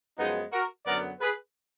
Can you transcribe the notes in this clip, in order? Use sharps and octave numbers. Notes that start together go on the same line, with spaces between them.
F#2 F3 G#3 B3 D#4
F#4 A#4
F#2 D3 F#3 B3 A#4 D5
G#4 B4